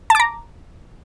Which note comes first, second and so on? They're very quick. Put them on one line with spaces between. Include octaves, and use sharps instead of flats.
A5 D6 A#5